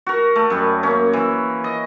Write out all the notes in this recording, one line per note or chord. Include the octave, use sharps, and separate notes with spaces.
F#4 A#4
A3
F#2 G3
A#3 C#4
E3
D#5